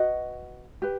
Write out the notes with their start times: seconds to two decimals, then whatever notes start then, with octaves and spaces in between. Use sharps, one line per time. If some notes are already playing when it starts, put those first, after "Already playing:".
Already playing: F#4 B4 D#5 F#5
0.82 G4 B4